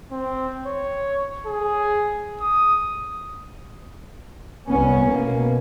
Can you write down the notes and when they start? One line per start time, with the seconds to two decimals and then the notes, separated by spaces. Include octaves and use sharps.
0.11 C4
0.66 C#5
1.47 G#4
2.40 D#6
4.68 C2 B3 C#4
5.04 B2 A#3